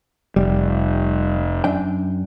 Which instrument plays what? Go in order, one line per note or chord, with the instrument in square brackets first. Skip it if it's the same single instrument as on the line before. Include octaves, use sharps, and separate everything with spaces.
[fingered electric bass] F1 [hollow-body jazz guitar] G3
[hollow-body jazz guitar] F#2 D4 G5